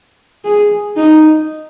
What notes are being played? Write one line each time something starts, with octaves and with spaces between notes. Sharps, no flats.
G#4
D#4